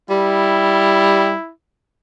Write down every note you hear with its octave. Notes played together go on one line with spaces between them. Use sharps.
G3 E4